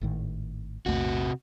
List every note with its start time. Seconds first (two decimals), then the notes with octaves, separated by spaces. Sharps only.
0.01 G#1 A2 D#3
0.86 A#1 E2 C3 A3 F#4